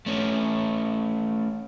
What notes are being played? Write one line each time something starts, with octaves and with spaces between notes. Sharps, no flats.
A3 C#4